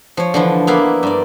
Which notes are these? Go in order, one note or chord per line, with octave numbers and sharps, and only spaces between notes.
F3 C#5
D3 E3 F3
A#3 B3 E4 D5 F5
G2 D5